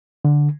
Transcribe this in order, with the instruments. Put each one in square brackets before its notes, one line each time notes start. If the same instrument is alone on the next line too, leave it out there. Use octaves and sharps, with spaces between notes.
[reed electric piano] D3